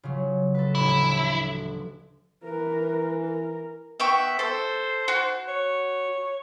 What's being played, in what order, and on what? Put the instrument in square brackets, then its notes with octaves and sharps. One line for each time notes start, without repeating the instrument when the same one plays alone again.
[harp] C#3 F3 F#3
A4 B4
[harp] A1 D2 [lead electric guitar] E4
[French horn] E3 [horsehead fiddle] A#4 B4
[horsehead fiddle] A#4
[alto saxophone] B3 [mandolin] E5 G5 C#6
[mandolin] A4 [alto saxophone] C5
[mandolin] F#4
[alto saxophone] C#5